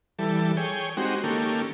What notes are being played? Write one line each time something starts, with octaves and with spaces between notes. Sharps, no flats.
E3 G3 A4
G#4 C#5 G5
G#3 C4 D#4 F#4 G4
D#3 A#3 C#4 G4 A4